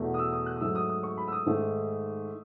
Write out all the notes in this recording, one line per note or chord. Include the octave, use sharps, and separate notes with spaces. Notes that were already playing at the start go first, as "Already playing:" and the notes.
Already playing: E2 B2 A3
D#6
E6
D#6
F#6
D#6
G#2 F#3 A3 E6
D#6
D#6
C#6
B5
E6
D#6
G#2 D#3 A3